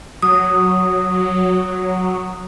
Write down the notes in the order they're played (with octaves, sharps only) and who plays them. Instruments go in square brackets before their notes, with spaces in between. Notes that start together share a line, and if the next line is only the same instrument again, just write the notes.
[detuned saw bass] F#3 [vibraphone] D#6